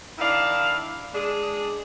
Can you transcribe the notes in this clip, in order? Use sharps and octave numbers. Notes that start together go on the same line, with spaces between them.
D#3 D4 E4 F5
G#3 D4 G#4